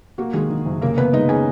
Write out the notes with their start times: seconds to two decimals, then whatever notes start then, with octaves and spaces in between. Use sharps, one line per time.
0.18 A#3 F#4
0.33 D#3 G#3 G#4
0.50 D#3
0.66 F#1
0.82 C#3 A#3 A#4
0.98 C#3 B3 B4
1.13 G#3 D#4 D#5
1.29 C#4 G#4 G#5